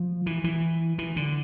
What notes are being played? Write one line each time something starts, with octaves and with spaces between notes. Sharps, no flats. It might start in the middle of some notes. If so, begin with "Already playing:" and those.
Already playing: F3
E3
E3
E3
D3